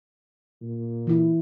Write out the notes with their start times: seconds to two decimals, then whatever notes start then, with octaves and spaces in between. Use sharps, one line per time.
0.62 A#2
1.07 E3 E4